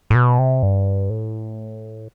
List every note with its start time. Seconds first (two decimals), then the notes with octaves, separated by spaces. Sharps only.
0.10 A2
0.15 B2
0.39 C3
0.63 G2
1.10 A2